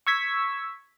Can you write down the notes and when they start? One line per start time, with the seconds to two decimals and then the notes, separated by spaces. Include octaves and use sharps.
0.07 C#6 E6 G#6 B6